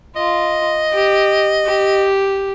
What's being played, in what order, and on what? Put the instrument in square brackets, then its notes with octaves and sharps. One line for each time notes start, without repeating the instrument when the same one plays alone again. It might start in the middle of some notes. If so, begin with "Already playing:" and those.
[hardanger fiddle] F4 [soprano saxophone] D#5
[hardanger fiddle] G4
G4